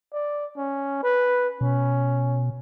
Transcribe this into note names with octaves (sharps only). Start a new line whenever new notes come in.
D5
C#4
B4
B2 C#4